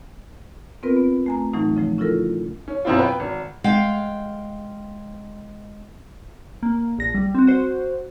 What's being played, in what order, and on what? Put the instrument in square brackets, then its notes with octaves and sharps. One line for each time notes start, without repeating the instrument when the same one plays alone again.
[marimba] B3 C4 F4 A#4 B4
B3
A3 G#5 A#5
A2 E3 F#3 A3 D#4
C#3 F3 A3
C#4 E4 F4 A4 A#4
[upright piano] C#4
F#2 B2 C4 E4 F4
B4 G5
G#1
[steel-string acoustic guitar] G#3 F5 G5
[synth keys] A#3
A#1 A#6
G3
C4 F#4
F#4 C5